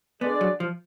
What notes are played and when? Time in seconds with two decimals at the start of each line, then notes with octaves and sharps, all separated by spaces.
0.21 D3 G#3 B3 D4 G#4 D5
0.41 F#3
0.60 F3